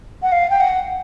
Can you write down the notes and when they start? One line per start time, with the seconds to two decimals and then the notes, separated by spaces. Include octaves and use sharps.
0.23 F#5
0.32 F5
0.50 G5
0.60 F#5